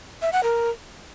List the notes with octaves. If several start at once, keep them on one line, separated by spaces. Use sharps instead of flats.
E5
F#5
A#4